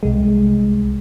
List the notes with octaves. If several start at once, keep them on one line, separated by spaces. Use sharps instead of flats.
C2 G#3